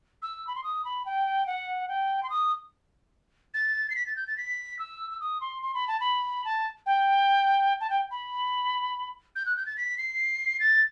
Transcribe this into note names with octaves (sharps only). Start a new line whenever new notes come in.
E6
B5
C6
D#6
B5
G5
F#5
G5
C6
D#6
A6
C7
B6
A6
G6
A6
B6
E6
E6
D#6
C6
C6
B5
A5
B5
A5
G5
A5
G5
B5
G6
F#6
G6
A6
B6
C7
A6